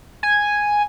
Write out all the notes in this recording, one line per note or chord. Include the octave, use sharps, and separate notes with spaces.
G#5